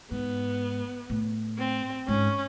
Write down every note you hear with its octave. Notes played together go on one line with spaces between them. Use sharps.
G#2 B3
A2
C4
G#2 C#4